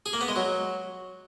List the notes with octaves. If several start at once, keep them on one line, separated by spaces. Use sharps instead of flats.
G#4
A#3
B3
G#3
F#3